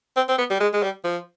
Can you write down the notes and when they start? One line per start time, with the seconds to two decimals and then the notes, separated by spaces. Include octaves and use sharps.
0.16 C4
0.29 C4
0.38 B3
0.50 G3
0.60 G#3
0.74 G#3
0.83 G3
1.04 F3